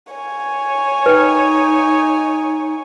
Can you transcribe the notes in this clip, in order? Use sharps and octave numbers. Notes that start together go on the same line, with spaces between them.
C#5 G#5
D#4 B4 G5